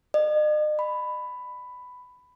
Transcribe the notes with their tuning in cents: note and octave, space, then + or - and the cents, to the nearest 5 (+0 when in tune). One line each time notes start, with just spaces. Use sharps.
D#5 -45
B5 +10